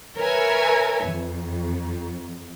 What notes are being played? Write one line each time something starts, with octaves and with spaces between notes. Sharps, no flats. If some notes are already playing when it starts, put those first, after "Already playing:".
A#4 B4 C#5 E5 G#5
F2